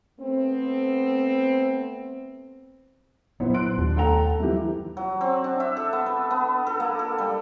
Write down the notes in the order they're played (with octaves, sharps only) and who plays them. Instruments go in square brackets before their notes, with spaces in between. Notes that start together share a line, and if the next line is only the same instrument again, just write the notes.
[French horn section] A3 B3 C4
[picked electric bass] A#2 F#3 [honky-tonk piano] B3 E4 C5
[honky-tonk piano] C6 F#6 D7
[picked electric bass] D#2 [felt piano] G3 D4
[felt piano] A2 A#5 [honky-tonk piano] A4 G5 F7
[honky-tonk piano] G2 E3 [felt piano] E4 G4
[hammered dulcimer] F#3
C4
D4
E5
A4
B3
B4
B3
A4
A#3
A4
G3